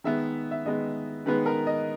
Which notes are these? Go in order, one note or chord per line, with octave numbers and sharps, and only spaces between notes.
D#3 G#3 B3 E5
E5
D#3 G#3 B3 D#5
D#3 G#3 B3 B4
A#4
D#5